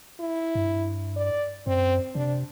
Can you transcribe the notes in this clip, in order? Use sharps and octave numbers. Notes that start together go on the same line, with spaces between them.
E4
G2
D5
F#2 C4
C3 D4